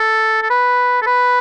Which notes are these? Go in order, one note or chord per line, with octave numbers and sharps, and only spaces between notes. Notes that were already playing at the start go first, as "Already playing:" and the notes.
Already playing: A4
A4
B4
A4
B4